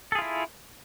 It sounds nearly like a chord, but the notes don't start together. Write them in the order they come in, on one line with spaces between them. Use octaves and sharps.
A4 G#4 F4 E4